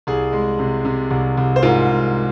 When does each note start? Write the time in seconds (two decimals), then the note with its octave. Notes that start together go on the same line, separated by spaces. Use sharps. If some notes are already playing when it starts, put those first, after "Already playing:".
0.07 C2 G#4
0.33 G#3
0.59 C3
0.85 C3
1.11 C2
1.37 C2
1.56 C5
1.62 G#2 F4 A#4
1.89 G#2